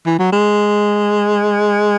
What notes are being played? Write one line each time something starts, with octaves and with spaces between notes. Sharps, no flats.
E3
F#3
G#3